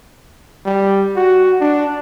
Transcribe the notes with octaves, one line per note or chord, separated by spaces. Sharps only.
G3
F#4
D4